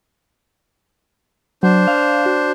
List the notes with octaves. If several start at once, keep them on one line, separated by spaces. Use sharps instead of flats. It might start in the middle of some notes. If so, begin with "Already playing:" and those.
F#3 D4 C5
F5
F#4